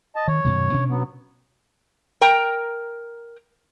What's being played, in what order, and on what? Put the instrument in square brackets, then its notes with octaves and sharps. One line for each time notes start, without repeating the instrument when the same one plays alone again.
[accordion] D#5 A5
[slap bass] D#3 [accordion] C#5
[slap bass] F#2 B2 D#3
B2 C#4 D4
[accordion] F#3 B3
[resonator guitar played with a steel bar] A#4 G5 A#5